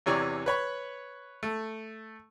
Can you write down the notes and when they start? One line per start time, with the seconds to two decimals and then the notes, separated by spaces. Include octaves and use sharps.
0.06 E2 C3 E3 C#5 D5 A#5
0.46 B4 C#5 B5
1.43 A3